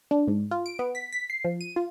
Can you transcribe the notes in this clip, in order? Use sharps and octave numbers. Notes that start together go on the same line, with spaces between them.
D4
G#2
F4
D7
B3
B6
B6
C7
F3
D#7
F4